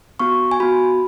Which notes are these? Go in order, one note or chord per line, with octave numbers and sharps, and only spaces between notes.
B3 F#4 C#6
G#5
B3 F#4 B5